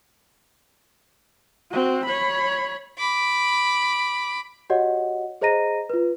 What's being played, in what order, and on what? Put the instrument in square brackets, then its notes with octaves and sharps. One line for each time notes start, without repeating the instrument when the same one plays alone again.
[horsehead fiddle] C4 F#4
C#5 B5
[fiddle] B5 D6
[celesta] F#4 G4 C#5 D#5 F#5
G#4 C5 D#5 A#5 A#6 D#7
F4 B4